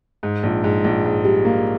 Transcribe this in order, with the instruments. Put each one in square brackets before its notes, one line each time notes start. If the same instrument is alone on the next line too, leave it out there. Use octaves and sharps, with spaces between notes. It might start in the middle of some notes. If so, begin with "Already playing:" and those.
[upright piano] G#2
A#1
G#2
A#1
G#2
G3
A#3